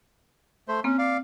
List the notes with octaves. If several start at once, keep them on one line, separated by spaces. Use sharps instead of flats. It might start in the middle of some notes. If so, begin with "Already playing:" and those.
A3 C5
A#3 C4 C#4
D5 F5